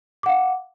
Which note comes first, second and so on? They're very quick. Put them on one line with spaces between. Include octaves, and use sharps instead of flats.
D6 F#5 F5